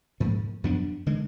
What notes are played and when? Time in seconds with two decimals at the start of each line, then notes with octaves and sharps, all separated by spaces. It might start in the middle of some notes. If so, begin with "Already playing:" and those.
0.20 G#2 F3 A#3
0.64 F#2 F3 B3 D4
1.06 D3 G#3